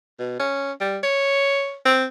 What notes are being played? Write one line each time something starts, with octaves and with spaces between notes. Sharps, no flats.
B2
C#4
G3
C#5
C4